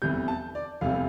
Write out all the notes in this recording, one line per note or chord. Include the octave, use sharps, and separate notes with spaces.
F1 E2 C3 G3 G6
A5
D5
F1 E2 C3 G3 F5